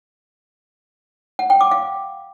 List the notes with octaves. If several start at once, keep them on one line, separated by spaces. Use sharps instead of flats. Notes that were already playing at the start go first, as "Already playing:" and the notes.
F#5
G5
D6
F5